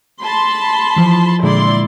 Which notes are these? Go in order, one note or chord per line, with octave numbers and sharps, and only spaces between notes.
A5 B5 C6
E3 F3
A#2 D3 G#3 E4 D5 C6